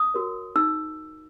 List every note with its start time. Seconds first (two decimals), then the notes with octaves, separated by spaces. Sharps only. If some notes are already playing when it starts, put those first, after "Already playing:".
Already playing: D#6
0.14 F#4 A#4 C#5
0.56 D#4 E6